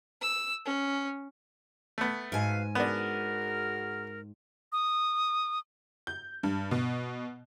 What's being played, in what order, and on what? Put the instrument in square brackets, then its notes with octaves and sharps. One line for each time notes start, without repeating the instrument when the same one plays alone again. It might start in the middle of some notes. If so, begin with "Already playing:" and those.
[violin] E6
C#4
[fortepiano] A3 B3
[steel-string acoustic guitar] G#2 G#5 [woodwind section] B2 B4 F5
[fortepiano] B3 D4 [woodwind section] F#4 G#4 A#4
[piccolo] D#6
[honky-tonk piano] G6
G2
B2